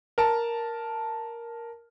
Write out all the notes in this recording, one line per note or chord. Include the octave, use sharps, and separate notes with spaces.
A#4 A5